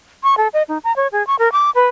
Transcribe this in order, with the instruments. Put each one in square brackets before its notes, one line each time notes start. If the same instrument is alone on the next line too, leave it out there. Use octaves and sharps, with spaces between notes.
[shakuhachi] C#6
A4
D#5
D#4
A#5
C#5
G#4
C#6
A#4
D6
B4